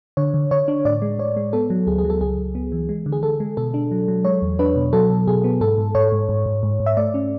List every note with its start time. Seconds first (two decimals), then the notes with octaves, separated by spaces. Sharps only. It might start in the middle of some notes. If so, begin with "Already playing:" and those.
0.17 D3 C#5
0.34 D3
0.51 D3 C#5
0.68 D4
0.85 A2 D5
1.02 G#3
1.19 A2 C#5
1.36 G#3
1.53 B3 A4
1.70 F#3
1.87 D2 G#4
1.98 G#4
2.05 F#3
2.10 A4
2.21 C#2 G#4
2.38 C#2
2.55 B3
2.72 E3
2.89 G#3
3.06 D3
3.12 G#4
3.23 D3 A4
3.40 G#3
3.57 B2 A4
3.74 D4
3.91 F#3
4.08 F#3
4.24 G#3 C#5
4.42 E2
4.59 D4 B4
4.76 B2
4.93 F#3 A4
5.10 B2
5.27 B2 G#4
5.44 B3
5.61 G#2 A4
5.78 G#2
5.95 G#2 C#5
6.12 G#2
6.29 G#2
6.46 G#2
6.63 G#2
6.80 G#2
6.86 E5
6.97 A3 D5
7.14 C#4